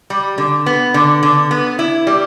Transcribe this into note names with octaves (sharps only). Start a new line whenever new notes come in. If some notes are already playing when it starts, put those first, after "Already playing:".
G3
D3
B3
D3
D3
B3
E4
G3